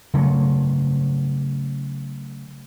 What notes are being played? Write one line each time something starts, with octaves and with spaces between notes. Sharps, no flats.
C#3 F#3 A3